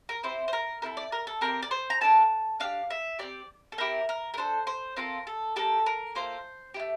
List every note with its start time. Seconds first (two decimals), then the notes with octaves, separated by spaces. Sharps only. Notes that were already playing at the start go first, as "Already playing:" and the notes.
0.09 A#4
0.23 C4 E4 G4 C5
0.48 C5
0.53 A#4
0.82 C4 E4 A4 A#4
0.97 D5
1.12 A#4
1.27 A4
1.41 C4 E4 G4 A#4
1.63 D5
1.71 C5
1.90 A#5
2.01 A#3 D4 A4 A5
2.60 D4 G4 F5
2.90 E5
3.19 C4 E4 G4 D5
3.72 A4
3.78 C4 E4 G4 A#4
4.09 A#4
4.34 A#4
4.37 D4 A4 C5
4.67 C5
4.96 C4 F4 A4 A#4
5.27 A4
5.56 A#3 D4 G4 A4
5.86 A#4
6.15 A#3 F4 A4 C5
6.74 E4 G4
6.80 A3